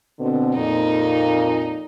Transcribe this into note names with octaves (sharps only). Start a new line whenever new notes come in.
B2 D3 C4
F2 A#2 D#4